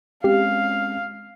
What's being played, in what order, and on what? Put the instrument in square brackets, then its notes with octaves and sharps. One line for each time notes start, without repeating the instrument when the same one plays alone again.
[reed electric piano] G#3 C4 C#4 [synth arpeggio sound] G4 C7 [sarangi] F5